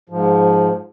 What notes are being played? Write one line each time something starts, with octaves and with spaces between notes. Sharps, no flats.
G#2 F3